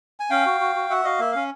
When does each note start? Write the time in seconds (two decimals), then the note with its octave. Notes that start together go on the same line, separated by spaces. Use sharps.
0.20 G#5
0.30 C#4 F5 G5
0.46 F#4
0.61 F#4
0.75 F#4
0.90 F#4 E5 F#5
1.05 F#4 D#5 F5
1.19 A#3 E5
1.32 C#4 F5